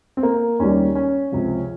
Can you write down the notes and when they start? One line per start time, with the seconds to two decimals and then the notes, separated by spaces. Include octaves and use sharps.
0.17 C4
0.23 A#3
0.59 D#2 D#3 G3 C#4
0.95 C#4
1.32 C#2 C3 F3